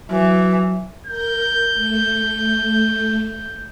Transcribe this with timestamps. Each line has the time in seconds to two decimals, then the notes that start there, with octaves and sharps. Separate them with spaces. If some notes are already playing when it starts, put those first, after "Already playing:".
0.11 E3 F#3
1.07 A#4 G6
1.75 A3